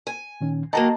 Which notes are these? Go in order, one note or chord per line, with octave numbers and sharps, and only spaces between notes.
G#5
A#2 D#3 C#4
D#3 F#3 A#3 D#5 A5 A#5